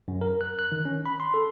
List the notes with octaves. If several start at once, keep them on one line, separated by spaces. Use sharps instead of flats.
F#2
A#4
F#6
F#6
D#3
C#4
B5
C6
A4